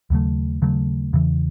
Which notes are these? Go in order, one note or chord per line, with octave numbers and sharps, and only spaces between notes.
D#2 C#3 F#3 A3
D#2 C#3 F#3 A3
E2 C#3 E3